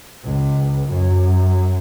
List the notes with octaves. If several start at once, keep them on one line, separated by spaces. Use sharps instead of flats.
C#2
F#2